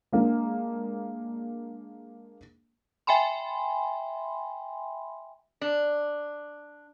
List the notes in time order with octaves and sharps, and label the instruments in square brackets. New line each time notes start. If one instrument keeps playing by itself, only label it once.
[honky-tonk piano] G#3 A#3 D4
[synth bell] E5 G5 G#5 B5 C6
[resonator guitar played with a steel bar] D4